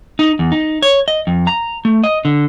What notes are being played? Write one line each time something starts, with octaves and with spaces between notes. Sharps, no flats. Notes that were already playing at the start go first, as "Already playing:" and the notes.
D#4
E2
D#4
C#5
D#5
F2
A#5
A3
D#5
D3